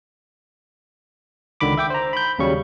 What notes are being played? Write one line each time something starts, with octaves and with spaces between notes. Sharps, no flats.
C#2 D3 D#3 B5 D6
E5 G5 D6
C5 A#5
B5 G6
D#2 C#3 F#3 G3 C#6